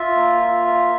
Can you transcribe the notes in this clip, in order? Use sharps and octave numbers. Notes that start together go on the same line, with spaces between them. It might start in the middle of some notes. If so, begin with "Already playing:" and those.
Already playing: F4 E5
A#3
F4
A#3